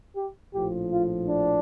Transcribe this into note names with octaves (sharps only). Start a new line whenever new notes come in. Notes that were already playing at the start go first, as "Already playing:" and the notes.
G4
A#1 A2 F3 G4
F4
D4